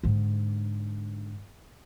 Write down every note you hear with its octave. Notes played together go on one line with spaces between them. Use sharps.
G#2 D3